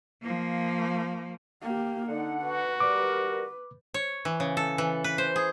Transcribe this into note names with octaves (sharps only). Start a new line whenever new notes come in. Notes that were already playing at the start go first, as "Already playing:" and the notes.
F3 A#3
A#3 G4
D3 D#4 F#5
F#4 B4
G3 A#4 D6
C#5
E3
C#3
A4
E3
B4
C5
G#4